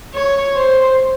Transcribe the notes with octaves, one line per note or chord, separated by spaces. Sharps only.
C#5
C5